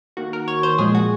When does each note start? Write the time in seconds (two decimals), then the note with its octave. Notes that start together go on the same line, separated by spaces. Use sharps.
0.17 D#3 A#3 F#4
0.33 A#4
0.48 C#5
0.63 C5
0.78 A#2 F3 G#3 G#4
0.95 F#4